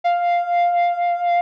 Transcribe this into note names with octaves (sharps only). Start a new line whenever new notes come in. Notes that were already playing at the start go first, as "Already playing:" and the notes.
F5